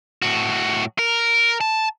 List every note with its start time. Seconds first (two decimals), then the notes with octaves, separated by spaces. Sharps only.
0.22 A2 F#4
0.99 A#4
1.61 A5